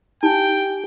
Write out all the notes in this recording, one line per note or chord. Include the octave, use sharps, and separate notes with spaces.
D#4 G4 G5 G#5